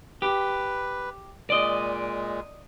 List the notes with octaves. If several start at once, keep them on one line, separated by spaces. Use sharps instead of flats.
G4 B4
A#2 G#3 D5 D#5